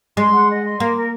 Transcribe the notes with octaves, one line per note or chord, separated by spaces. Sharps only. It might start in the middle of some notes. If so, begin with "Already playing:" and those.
G#3 C6
F#5
D#5
C6
A#3 A#4
A#4